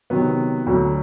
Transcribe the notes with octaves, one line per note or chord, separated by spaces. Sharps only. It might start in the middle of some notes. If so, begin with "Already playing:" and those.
C3 D#3 F#3 B3
D2 D3 F#3